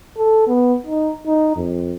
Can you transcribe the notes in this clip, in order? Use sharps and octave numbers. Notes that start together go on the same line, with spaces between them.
A4
B3
D#4
D#4
F2